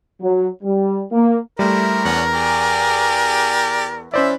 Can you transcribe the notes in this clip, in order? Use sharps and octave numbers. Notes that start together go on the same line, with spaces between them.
F#3
G3
A#3
G3 A3 E4 A#4 C5
E2 C#4 D4 F#5
G4 G#4 D5
E3 C#4 C5 D5 E5 B5